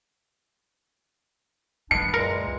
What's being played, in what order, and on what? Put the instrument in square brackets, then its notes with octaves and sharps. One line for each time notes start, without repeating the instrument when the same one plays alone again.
[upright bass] C#2 F#2 [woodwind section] B3 D4 [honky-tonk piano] C#7
[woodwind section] E2 A#2 G#3 [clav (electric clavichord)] A#4